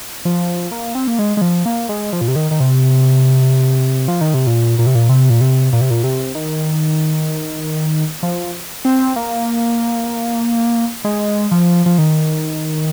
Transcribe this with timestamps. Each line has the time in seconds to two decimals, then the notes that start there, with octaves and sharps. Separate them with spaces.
0.25 F3
0.72 A#3
0.95 C4
1.07 A#3
1.19 G#3
1.37 G#3
1.42 F3
1.66 A#3
1.89 G#3
2.13 F3
2.21 A#2
2.28 C3
2.36 D#3
2.51 D#3
2.60 C3
4.08 F3
4.21 D#3
4.34 C3
4.47 A#2
4.79 A#2
4.87 C3
4.95 A#2
5.09 C3
5.30 A#2
5.41 C3
5.73 A#2
5.81 C3
5.90 A#2
6.04 C3
6.35 D#3
8.23 F3
8.85 C4
9.16 A#3
11.04 G#3
11.51 F3
11.86 F3
11.98 D#3